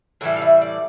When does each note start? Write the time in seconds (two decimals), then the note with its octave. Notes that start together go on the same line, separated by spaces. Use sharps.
0.21 A2 E3 G3 E5
0.36 F5
0.42 E5
0.62 D5